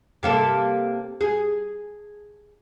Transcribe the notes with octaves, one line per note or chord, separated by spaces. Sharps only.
C3 A#3 A4
G#4